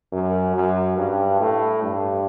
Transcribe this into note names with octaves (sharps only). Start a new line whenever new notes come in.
F#2
F#2
G2
A2
G2